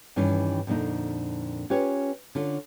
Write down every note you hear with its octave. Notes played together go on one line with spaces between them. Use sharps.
G2 D#3 E3 C#4
F2 A#2 D3 A#3 D#4
C#4 F4 G4 B4 C#5
D3 C#4 F4